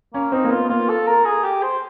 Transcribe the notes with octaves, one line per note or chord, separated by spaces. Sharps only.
A#3 C#4
C4 D#4
A#3
B3 F4
A#3 F4
A4
A#4
G#4
G4
C5